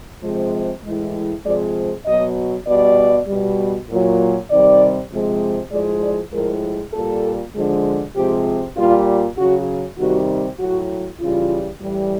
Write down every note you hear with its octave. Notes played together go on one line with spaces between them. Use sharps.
C3 F3 G#3
A2 E3 G#3
C3 F3 G#3 D5
B2 F#3 D#5
B2 G3 D5
B2 G3
A#2 F#3
C3 D#3 G3 D5
C3 F3 G#3
A2 F3 G#3 D5
D5
A2 F3 G#3 A#4
A#2 G3 A4
D3 F3 G#3
C3 F3 G#3 G4
A#2 G3 F4
C#3 F#3 F#4
C3 D#3 G3 F#4
A2 F#3 F#4
C#3 E3 G3 F4
A2 E3 G3